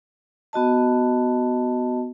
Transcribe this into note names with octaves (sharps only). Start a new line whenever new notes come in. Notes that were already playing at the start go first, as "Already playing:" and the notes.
B3 F#4 D#5 A5